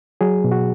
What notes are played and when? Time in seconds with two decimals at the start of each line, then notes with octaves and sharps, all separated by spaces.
0.21 F#3 G#4
0.44 B2
0.52 F#4